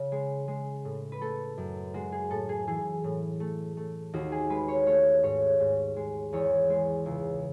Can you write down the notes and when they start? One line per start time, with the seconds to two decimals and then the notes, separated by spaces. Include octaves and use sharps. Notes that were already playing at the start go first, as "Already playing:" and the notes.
Already playing: C#3
0.12 G#3
0.48 G#3
0.85 A2
1.12 B4
1.21 A3 A4
1.58 F#2
1.94 G#3 F#4
2.12 G#4
2.30 A2 A4
2.49 G#4
2.67 E3 G#4
3.04 A2
3.40 A3
3.77 A3
4.13 D#2 F#4
4.32 G#4
4.50 G#3 B4
4.68 C#5
4.86 A3 C#5
5.23 G#2 C#5
5.60 G#2
5.96 G#3
6.33 E2 C#5
6.70 G#3
7.06 C#2